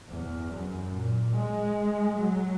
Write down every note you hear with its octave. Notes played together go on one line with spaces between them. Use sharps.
E2
F#2
A#2
G#3
F#3